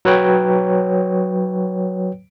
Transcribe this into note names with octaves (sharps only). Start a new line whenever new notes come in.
F#3 B4 C#5 G5